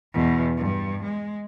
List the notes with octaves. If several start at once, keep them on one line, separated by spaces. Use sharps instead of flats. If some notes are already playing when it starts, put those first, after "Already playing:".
E2 B2
G2
G#3